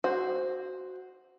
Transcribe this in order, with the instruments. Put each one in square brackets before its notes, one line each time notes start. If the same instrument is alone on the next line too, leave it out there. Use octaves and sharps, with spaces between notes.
[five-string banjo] F#4 [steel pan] C5